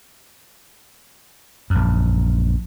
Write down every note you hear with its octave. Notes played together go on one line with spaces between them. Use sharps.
A#1 F#2